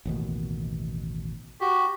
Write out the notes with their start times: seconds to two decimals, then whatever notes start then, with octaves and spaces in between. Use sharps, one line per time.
0.05 A1 D#2 B2
1.61 F#4 G4